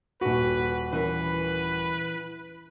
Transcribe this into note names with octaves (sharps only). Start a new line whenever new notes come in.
D#1 F#4 B4
E3 C#4 A#4 B4